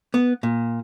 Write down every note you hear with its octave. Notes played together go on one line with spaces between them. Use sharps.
B3
A#2